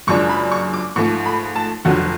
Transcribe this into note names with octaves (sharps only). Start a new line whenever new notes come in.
F#1 F#2 F3 G#3 D4 C#6
B5
C#6
D6
G#2 F3 A3 C#6
B5
A5
F1 F2 D3 F#3 F#5